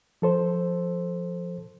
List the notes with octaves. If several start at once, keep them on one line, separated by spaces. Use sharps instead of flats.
F3 A4 C5